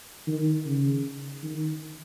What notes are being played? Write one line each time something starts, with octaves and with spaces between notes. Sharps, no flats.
D#3
C#3
D#3